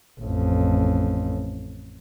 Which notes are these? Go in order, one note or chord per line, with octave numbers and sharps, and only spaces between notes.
A1 F2